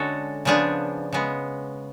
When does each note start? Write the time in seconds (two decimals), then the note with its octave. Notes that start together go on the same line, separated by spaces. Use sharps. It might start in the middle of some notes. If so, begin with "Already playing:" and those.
Already playing: D3 G#3 C#4 F#4 A4
0.45 C#3 F3 B3 D4 G#4
1.13 C#3 G#3 B3